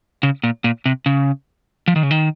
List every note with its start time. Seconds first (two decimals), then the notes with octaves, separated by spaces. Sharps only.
0.23 C#3
0.44 A#2
0.64 A#2
0.86 C3
1.06 C#3
1.88 F3
1.96 D#3
2.03 C#3
2.11 D#3